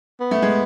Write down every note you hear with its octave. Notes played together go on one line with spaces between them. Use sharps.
B3
A3
G#3